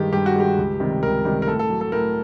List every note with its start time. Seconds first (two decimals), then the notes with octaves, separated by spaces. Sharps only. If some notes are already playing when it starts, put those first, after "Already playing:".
Already playing: G2 D#3 G#3 G4
0.13 G2 G4
0.26 F#4
0.36 D#3 G#3 G4
0.58 C#2
0.80 C3 D#3 G3
1.03 C#2 A#4
1.25 C3 D#3 G3
1.42 A#4
1.47 A2 A4
1.59 A4
1.70 F#3
1.81 A4
1.92 A2 A#4